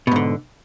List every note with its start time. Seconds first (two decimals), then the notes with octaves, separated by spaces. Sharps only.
0.07 B2
0.11 G#2
0.16 D3